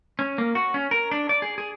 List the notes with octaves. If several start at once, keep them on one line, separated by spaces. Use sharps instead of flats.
C#4
A#3
F#4
C#4
A#4
D4
D5
G#4
G#4